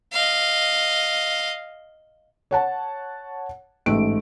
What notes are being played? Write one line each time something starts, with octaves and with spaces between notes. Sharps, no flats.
D#5 F5
C#5 F#5 A5
A1 G#2 A3 D7